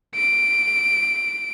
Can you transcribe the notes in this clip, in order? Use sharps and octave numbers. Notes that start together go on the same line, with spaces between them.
D7